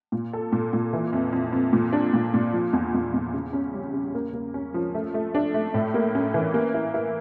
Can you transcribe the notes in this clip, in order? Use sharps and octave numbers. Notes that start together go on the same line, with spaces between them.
A#2
A4
A#2
A#2
E3
F2
F2
F2
A#2
D4
A#2
A#2
F3
E2
E2
E2
C#3
C#4
G3
C#3
A#3
A#3
C#4
F3
A3
A3
D4
A3
A2
A#3
C#4
E3
A#3
E4
E4